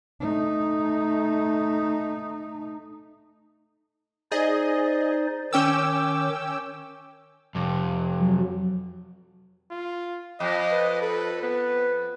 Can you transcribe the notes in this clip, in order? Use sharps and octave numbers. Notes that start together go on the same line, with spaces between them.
A3 D#4
D#4 G#4 C5 D5 D#5
D#3 C#4 G5 D6 E6
F2 C3
F#3
F4
F2 D#5
B4
A4 B4
B3 B4